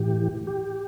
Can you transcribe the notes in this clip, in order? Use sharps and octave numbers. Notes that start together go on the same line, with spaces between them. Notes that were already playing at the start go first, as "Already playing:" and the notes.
Already playing: A2 E3 G4
G4